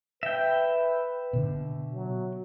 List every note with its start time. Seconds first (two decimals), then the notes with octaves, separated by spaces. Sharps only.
0.23 B4 E5 G5
1.33 B2 D3
1.92 F#3